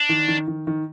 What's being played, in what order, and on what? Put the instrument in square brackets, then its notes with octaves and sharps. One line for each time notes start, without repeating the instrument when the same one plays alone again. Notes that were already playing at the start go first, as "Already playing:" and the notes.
Already playing: [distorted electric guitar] D4
[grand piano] D#3
D#3
D#3
D#3